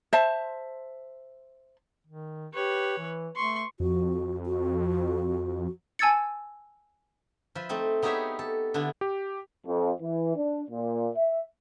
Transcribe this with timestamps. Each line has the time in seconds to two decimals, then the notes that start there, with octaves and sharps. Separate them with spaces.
0.13 C5 E5 A5
2.07 D#3
2.54 G4 B4 C#5
2.98 E3
3.36 A3 C6 C#6
3.80 F2 F#4
4.46 F#4
5.99 G#5 A5 E6 G#6 A6 C#7
7.55 F3 B4 E5
7.69 A3 C4 D#4
8.02 B3 D#4 G4 G#4 C#5 E5
8.39 A4
8.74 D3 B3 D4 E4 C6
9.01 G4
9.67 F2
10.02 E3
10.36 D4
10.71 A#2
11.16 E5